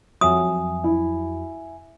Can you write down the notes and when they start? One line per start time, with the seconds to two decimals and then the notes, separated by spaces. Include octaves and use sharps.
0.21 F2 F#3 E5 G#5 D#6
0.84 E4